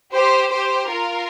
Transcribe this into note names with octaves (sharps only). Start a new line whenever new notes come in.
G4 C5
G4 C5
F4 A#4